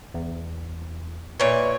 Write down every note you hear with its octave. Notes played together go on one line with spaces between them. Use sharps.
E2
A#2 B4 C#5 D5 E5